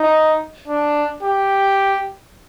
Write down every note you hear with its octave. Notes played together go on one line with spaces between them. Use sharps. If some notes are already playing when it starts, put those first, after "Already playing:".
Already playing: D#4
D4
G4